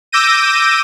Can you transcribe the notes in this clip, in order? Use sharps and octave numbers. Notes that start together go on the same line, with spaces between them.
D6 E6 G6 A#6 D#7